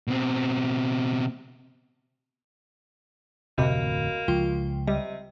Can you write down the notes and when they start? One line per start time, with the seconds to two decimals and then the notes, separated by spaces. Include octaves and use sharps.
0.08 B2 C4
3.58 D1 F2 C3 A#3 F#4 D#5 B5
4.28 C#2 F3 F4 G5
4.87 C3 G3 D#5